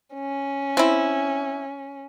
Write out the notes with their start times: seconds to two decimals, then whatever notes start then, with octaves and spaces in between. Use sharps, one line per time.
0.14 C#4
0.77 C4 E4